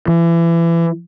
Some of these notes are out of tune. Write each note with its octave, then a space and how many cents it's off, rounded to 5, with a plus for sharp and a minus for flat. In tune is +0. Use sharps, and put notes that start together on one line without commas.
E3 +30